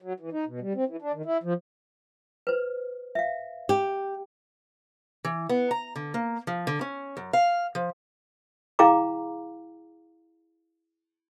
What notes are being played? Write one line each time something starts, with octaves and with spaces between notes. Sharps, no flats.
F#3
E3
D#4
B2
G3
C4
E3
D4
D#3
E4
F3
B4 C5
E5 F5
G4
E3
B3
A#5
D3
A#3
F3
D3
C#4
F#2
F5
F3
E4 G#4 F5 G5 A#5 D6